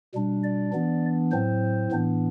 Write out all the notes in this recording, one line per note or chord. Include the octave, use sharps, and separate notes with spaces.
B2 G3 D4
D5
E3 B3 D4
A2 F#3 C4 C5
A2 E3 B3 D4